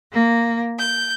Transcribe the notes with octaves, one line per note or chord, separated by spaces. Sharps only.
A#3
G6